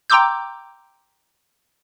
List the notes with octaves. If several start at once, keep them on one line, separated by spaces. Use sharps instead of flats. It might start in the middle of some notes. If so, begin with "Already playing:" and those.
G5 A#5 C6 D6 E6 G6